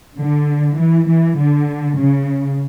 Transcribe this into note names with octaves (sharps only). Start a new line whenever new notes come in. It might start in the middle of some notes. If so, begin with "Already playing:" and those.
D3
E3
E3
D3
C#3